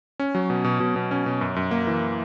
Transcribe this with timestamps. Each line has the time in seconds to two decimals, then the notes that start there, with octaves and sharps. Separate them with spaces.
0.19 C#4
0.35 F#3
0.50 B2
0.64 B2
0.80 B2
0.96 B2
1.11 C#4
1.26 B2
1.41 F#2
1.56 F#2
1.71 A#3
1.87 E3